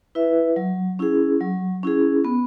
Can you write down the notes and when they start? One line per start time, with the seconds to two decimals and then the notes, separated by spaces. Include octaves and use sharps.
0.15 E4 B4 E5
0.56 F#3
0.99 C#4 E4 G#4
1.41 F#3
1.83 C#4 E4 G#4
2.25 B3